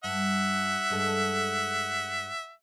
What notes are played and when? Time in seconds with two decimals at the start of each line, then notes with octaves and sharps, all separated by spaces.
0.04 G2 E5 F#5
0.90 G2 G#3 A4